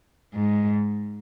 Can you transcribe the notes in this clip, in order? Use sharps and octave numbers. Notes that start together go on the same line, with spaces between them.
G#2